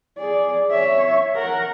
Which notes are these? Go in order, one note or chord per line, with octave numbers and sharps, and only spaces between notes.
G#4 D5
C#5 E5
A#4 F#5